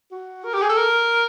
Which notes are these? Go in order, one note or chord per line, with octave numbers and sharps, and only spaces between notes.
F#4
A#4
G4
G#4
A4
A#4